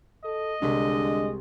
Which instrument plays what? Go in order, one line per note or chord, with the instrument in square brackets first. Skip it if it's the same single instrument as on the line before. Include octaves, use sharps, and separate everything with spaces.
[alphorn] A4 [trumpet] D#5
[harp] C2 B6 [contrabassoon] D3 [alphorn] G#3